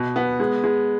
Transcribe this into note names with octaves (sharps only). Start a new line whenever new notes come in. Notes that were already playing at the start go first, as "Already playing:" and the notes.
Already playing: B2
B3
G#3
G#3